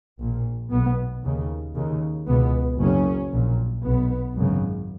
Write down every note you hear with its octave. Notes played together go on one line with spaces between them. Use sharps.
A#1 A#2
B1 B2 B3
D#2 C#3
D#2 C#3
C#2 B2 B3
F#1 F#2 C#3 C#4
A#1 A#2
B1 B2 B3
G#1 F#2 C#3